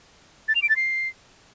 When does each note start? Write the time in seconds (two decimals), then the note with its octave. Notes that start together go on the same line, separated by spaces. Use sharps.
0.48 A6
0.55 F7
0.62 D7
0.69 A6
0.76 C7